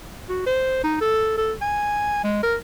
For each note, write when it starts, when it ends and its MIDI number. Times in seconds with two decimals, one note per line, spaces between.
0.29 0.42 66
0.46 0.83 72
0.83 0.98 63
1.01 1.33 69
1.37 1.53 69
1.61 2.23 80
2.24 2.42 56
2.43 2.56 70